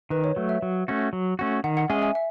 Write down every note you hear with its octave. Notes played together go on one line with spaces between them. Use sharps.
D#3 B4
C#5
F#3 A3
E5
F#3
A3 C#4 F#4
F#3
A3 C#4 F#4
D#3 F#5
F#5
G#3 C#4 G#4 D#5 E5 G#5
E5 G#5
E5